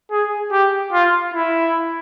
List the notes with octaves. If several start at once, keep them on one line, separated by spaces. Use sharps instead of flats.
G#4
G4
F4
E4